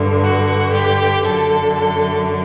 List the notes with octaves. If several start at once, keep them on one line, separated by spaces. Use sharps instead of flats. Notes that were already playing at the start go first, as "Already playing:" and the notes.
Already playing: G2 D3
F#4
G4
F#2 D3 A4
A4